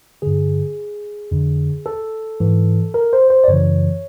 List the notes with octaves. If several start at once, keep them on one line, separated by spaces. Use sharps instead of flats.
G2 D3 G#4
F2 D3
A4
G#2 E3
A#4
C5
C5
D5
F#2 C#3 E3 C#5